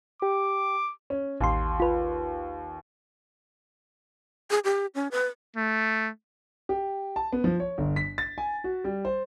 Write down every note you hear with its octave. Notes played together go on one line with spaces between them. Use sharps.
G4 D6
C#4
A1 D#2 C6
F4 B4
G#4
G4
C#4
B4
A3
G4
A5
B3
F3
C#5
G1
B6
A6
G#5
F#4
G3
C5